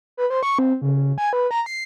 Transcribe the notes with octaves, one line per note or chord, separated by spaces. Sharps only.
B4
C5
C#6
C4
C#3
G#5
B4
A#5
C7